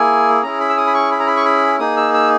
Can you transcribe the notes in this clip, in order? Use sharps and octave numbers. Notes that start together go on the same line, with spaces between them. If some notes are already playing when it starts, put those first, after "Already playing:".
Already playing: A#3 E4 G#4 G#5
C#4 E4 G#4 A#5
B5
E6
D#6
B5
C#6
B5
A#5
B5
C#6
B5
A#3 D#4 G#4 D#6
E6
E6